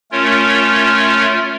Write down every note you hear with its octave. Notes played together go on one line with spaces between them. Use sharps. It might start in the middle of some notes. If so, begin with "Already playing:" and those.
A3 C#4 F4 A#4 C#5